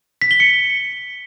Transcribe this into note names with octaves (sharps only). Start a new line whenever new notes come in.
B6
G7
C#7